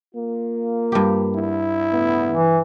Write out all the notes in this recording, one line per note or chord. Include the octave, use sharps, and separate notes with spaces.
A#3 F4
G2 G4
E4
A2 C#3 B3
E3